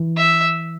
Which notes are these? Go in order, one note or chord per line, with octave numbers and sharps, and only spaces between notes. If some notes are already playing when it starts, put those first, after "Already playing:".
Already playing: E3
E5